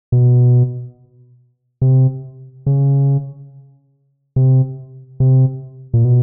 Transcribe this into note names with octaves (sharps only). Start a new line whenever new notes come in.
B2
C3
C#3
C3
C3
A#2
B2